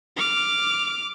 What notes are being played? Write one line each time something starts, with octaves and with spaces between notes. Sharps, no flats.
D6 F6